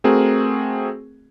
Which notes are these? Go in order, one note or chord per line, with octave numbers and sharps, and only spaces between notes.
A3 C4 F#4 G#4 A#4